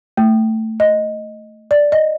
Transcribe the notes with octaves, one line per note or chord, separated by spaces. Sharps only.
A3
D#5
D5
D#5